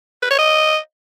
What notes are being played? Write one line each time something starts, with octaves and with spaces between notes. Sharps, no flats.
B4
C#5
D#5